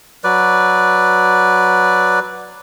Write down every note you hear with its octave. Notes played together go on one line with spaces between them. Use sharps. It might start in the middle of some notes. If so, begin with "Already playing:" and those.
F#3 B4 D5